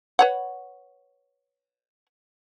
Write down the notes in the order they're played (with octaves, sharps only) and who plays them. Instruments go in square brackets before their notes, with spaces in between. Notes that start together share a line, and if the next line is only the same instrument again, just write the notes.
[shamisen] B4 C#5 F#5